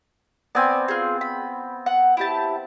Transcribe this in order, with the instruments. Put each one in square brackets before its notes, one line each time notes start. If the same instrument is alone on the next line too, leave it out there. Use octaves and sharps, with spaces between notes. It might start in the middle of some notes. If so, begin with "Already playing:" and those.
[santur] B3 C4 [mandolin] D5 G#5
[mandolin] F4 G#4
B5
F#5
E4 G4 A5